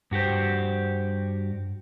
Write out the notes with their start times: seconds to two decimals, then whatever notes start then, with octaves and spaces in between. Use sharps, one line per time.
0.11 G2 F#4 G4 C5